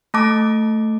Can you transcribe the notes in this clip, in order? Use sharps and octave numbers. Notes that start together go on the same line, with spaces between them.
A3 A5 D6